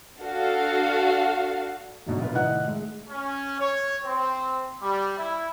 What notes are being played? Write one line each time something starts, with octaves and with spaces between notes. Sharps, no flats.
D4 F#4 A4 F5
G#2 B2 D3 F#3
A#1 F4 B4
C2 A2 D#3 D#5 F#5 F#6
G#3 A3
C#4
C#5
C4
G3
E4